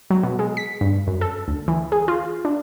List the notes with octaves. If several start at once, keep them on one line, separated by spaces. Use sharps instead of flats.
F#3
B2
G#3
B6
G2
F#2
A4
D2
E3
G#4
F4
D4